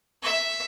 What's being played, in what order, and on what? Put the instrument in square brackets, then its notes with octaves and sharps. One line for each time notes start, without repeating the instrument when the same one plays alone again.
[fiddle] E5